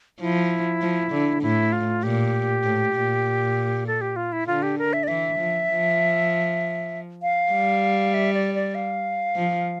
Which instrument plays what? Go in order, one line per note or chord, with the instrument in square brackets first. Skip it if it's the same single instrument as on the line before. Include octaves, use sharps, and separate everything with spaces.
[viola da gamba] F3 [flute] E4
[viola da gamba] F3
D3
[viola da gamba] A2 [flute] E4
[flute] F4
[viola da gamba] A#2 [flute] G4
[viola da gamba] A2
A#2
[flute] A4
G4
F4
E4
[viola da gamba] D3 [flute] F4
[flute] G4
A#4
E5
D5
[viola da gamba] E3 [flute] E5
[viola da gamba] F3
F3
[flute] F5
[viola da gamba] G3
[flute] E5
D5
D5
F5
[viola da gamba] F3